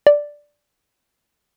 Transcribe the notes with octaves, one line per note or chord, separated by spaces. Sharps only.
D5